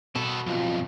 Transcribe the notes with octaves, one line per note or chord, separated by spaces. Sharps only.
B2 B3 A4
B1 F2 F4